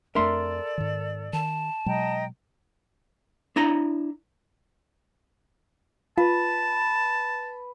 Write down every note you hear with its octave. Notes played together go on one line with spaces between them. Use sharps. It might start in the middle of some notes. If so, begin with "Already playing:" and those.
F2 A3 D4 A4 A#4 D5 E5 C6
G#2 D#3
D#3 A5
B2 F#3 G#3 D#5 G5 A#5
D4 E4 A#5
F4 B4 A5